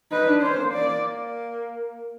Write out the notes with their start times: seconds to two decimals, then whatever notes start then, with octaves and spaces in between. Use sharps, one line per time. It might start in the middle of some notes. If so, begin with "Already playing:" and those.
0.12 D#4 B4
0.28 D4
0.43 C#4 C5
0.59 A#3
0.73 D5